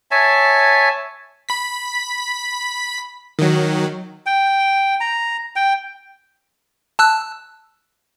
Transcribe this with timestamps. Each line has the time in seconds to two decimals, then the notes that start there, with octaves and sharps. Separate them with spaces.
0.11 C#5 E5 G#5 A5
1.49 B5 B6
3.39 D#3 F#3
4.26 G5
5.01 A#5
5.56 G5
6.99 A5 E6 F#6